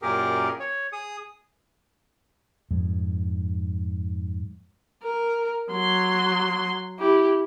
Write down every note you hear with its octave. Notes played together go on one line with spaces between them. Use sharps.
F#2 A#2 G4 G#4 A#4
C#5
G#4 D#6
F2 G#2
A#4
F#3 C6
E4 G4